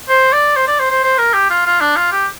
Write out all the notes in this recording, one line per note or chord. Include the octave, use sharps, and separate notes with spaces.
C5
D5
C5
D5
C5
C5
C5
A#4
G4
F4
F4
D4
F4
G4